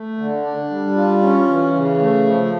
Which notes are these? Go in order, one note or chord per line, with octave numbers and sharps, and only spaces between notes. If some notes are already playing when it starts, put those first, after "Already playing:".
Already playing: A3
D3
D4
G3
F4
C#4
E3
C#3
A3
F3